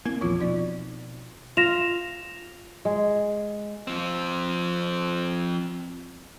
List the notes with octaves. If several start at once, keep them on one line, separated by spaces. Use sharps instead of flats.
A#3 C4 E4
A#1 E2 F3 F4
B2 D#4 D5
F4 A#6 E7 F7
G#3
F3 C4